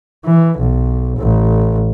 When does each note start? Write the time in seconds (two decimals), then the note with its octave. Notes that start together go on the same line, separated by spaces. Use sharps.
0.25 E3
0.59 B1
1.18 A1